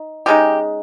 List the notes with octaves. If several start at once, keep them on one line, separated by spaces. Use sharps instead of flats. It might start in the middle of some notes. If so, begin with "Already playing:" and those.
Already playing: D#4
C#3 G#3 D#4 G4